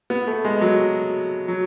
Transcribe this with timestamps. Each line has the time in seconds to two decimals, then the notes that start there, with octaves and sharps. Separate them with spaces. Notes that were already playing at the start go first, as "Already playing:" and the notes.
0.10 B3
0.27 A3
0.45 G#3
0.61 F#3
1.48 F#3